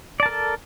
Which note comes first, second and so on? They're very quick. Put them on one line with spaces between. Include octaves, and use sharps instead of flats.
D5 A5 A#4 A4